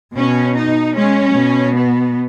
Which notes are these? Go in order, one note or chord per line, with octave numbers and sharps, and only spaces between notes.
B2 C#4
D#4
G#3 C#4
B2
B3